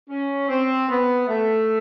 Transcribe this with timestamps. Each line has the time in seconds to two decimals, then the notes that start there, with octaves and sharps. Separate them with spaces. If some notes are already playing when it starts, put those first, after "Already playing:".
0.09 C#4
0.48 C4
0.89 B3
1.28 A3